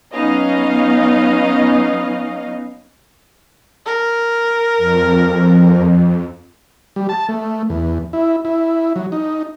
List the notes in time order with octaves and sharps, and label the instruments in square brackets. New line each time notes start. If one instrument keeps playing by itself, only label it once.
[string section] F#3 B3 C#4 D#4 D#5 F5
[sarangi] A#4
[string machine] F2
[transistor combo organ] G3
A5
A3
E2
E4
E4
F#3
D#4